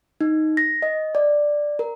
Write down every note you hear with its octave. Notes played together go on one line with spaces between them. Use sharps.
D#4
A#6
D#5
D5
A#4